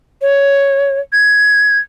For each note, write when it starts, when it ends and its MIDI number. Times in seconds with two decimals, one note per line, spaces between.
0.22 1.00 73
1.13 1.79 92